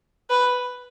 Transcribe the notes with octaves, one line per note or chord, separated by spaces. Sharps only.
B4